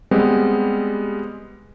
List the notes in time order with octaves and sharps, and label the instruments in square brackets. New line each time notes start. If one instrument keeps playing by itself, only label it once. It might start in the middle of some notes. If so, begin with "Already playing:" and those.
[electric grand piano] G3 G#3 B3 C4